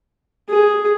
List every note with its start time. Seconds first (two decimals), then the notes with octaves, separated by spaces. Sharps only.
0.49 G#4